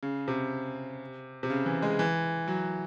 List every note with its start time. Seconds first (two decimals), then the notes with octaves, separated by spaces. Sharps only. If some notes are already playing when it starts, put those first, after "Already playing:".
0.03 C#3
0.28 C3
1.43 C3
1.50 C#3
1.66 E3
1.82 G#3
1.99 E3
2.48 F#3